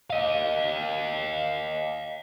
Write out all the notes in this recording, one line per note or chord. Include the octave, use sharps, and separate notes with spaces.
D#5 F5